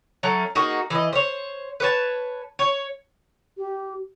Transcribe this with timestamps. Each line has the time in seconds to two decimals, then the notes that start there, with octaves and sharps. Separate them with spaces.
0.23 F#3 A3 C#4
0.55 A#3 D#4 F#4 G#4
0.90 E3 D#5
1.13 C5 C#5
1.80 B4 C#5 A5
2.59 C#5
3.57 G4